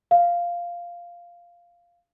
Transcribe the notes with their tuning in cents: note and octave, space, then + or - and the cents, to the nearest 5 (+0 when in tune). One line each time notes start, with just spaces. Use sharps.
F5 -5